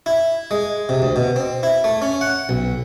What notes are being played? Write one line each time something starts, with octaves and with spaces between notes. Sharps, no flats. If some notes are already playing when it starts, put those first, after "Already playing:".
E4
G#3
C3
D2
B2
C4
E4
A3
C#4
F#5
B1